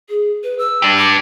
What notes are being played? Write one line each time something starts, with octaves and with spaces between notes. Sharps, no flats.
G#4
B4
E6
D4 G4
D6